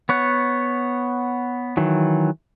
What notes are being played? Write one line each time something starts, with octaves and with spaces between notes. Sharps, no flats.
B3 C#5 F#5
D#3 E3 F#3